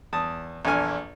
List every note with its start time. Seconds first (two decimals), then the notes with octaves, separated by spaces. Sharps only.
0.13 E2 A5 D#6
0.65 A#1 E2 A4 G#5 F6